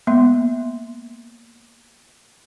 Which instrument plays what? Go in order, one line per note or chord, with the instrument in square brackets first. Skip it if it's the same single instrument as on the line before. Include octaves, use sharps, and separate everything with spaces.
[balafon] G#3 A#3 B3 E5 C6